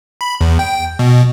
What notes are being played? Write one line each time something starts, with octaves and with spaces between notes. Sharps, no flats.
B5
E2
G5
B2